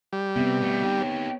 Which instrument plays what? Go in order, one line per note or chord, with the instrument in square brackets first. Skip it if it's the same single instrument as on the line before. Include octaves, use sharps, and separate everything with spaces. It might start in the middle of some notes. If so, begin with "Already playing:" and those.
[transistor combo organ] G3
[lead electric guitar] C3 [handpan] B3 C4
[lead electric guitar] B2 A3
D#4 G4
[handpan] C#5